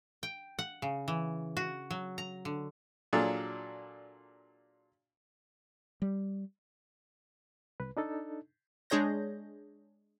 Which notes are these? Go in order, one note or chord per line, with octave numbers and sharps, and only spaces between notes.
G5
F#5
C#3
E3
F#4
F#3
A#5
D3
A#2 F#3 D4 F4 G#4 A4
G3
C2 B4
D4 D#4 A4
G#3 D4 G#4 C#5 G6 A#6